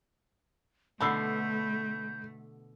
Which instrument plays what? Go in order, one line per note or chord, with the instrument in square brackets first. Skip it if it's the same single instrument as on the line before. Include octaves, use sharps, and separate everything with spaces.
[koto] B2 D3 B3 [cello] A3 [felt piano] B5 E6 C7 [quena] G6